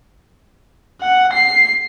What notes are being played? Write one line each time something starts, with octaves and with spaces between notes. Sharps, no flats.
F#5
C7